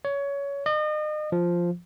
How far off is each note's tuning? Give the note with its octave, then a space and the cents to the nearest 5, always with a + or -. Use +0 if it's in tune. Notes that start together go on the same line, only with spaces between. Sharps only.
C#5 +20
D#5 -35
F3 -5